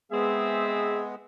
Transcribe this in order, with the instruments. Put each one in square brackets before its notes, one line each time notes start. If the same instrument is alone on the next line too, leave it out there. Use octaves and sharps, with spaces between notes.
[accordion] G#3 B3 [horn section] C4 E5 [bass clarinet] G#4